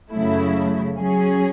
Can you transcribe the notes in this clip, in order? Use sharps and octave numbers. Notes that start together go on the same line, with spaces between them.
F#2 C#3 F#3 A3 E4
F#3 C#4 G#4